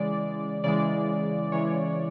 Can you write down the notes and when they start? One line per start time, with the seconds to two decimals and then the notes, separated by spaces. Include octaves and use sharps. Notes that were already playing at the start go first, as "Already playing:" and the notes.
Already playing: C#3 E3 G#3 D5
0.64 C#3 E3 G#3 D5
1.52 C#3 E3 G#3 C#5